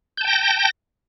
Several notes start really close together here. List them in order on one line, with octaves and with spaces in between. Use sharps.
G6 A5 G5 A#6